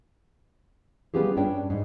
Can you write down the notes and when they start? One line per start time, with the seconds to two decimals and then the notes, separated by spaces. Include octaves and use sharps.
1.14 G3 B3 C#4 F4 G4 G#4
1.37 G2 C#4 D4 G5
1.70 G#2